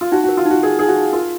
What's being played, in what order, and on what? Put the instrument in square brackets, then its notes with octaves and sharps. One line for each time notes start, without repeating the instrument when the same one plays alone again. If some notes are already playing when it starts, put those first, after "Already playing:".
[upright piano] F4
[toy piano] D#4 [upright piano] F#4
[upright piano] F#4 [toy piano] A#4
[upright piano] F4
[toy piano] D#4 [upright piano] F#4
[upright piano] G#4 [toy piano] A#4
[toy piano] D#4 [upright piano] G#4
[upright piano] F#4
[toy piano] D#4
[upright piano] F4 [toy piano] A#4